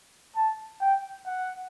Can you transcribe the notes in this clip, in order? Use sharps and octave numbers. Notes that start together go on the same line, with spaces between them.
A5
G5
F#5